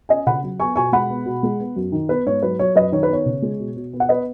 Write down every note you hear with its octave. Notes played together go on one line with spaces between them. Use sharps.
C#4 D#5 G#5
C#3 F#5 B5
F#3
B3 G#5 C#6
B2 G#5 C#6
G#3 F#5 B5
B3
B2
G#3
B3
F#2
D#3
B3 B4
G#2 C#5
F#3 B4
F#3 C#5
F#2 B4 D#5
D#3 C#5
B4
B3 C#5
C#3
G#3
B2
B2
B3
F#5
B3 B4 D#5